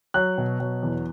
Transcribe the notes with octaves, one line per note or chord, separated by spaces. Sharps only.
F#3 F#6
B2
F#3
E2